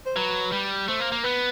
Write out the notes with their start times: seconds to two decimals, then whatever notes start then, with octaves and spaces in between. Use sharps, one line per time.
0.06 C5
0.16 F#3 B4
0.52 G3
0.88 A3 C5
1.00 A#3
1.12 A#3
1.24 B3 B4